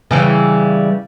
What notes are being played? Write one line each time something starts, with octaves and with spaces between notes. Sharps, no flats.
C#3 E3 G3